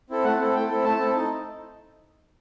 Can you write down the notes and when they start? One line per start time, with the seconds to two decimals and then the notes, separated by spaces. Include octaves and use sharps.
0.10 C4 E4 A4
0.24 A3 F#5
0.40 C4 E4 A4
0.54 A3 G5
0.69 C4 E4 A4
0.84 A3 A5
0.99 C4 E4 A4
1.14 D#4